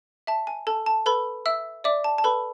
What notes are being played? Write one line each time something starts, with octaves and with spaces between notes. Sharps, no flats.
E5 A5
G#5
A4 A5
A5
A4 B4 B5
E5 E6
D5 E5 D6
A5
A5
A4 B4 B5